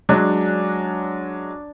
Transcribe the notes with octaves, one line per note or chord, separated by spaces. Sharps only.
F#3 G#3 D4